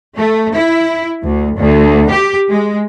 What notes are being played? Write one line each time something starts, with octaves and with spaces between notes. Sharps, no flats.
A3
E4
D2
D2
G4
G#3